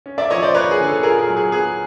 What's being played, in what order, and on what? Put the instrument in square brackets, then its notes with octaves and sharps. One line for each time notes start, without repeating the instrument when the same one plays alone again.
[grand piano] C#4
D5 E5
F3 C#5 D#5
C5 D5
A#3 B4 C#5
G#4
D3
A4
A#2 G#4 A#4
G#4 A#4
F#3
G#4
B3 G#4